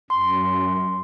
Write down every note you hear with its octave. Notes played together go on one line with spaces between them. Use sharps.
F#2 C6